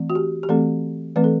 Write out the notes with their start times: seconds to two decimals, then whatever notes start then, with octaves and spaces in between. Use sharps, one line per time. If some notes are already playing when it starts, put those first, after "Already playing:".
Already playing: E3 A3 C4
0.10 F#4
0.15 G4
0.43 G4
0.49 E3 A3 C4 A4
1.16 E3 A3 C4 B4
1.24 A4